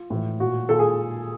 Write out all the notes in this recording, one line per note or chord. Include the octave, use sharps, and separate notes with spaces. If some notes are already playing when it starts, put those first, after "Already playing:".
Already playing: F4
A2 E3
A#2 F#4
A#2 A4
G#4